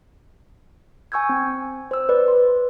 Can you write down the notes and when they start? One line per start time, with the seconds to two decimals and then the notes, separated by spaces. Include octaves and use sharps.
1.12 G#5 C#6 E6 G6 G#6
1.29 C4
1.91 C5 E6
2.09 B4 D5
2.28 C6